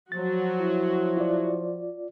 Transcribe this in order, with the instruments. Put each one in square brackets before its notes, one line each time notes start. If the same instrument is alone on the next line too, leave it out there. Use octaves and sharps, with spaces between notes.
[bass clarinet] F3 [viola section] F#3 F#4 [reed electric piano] A6
[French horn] E4
[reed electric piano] F4 D5